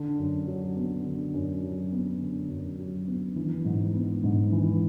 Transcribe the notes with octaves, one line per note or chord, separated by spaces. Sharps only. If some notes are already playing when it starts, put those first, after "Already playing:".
Already playing: D3
F#2
F#3
B3
D3
F#2
F#3
B3
D3
F#2
F#3
B3
E3
G#2
B3
G#2
E3